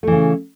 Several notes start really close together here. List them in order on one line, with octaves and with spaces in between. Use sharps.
A3 E3 C#3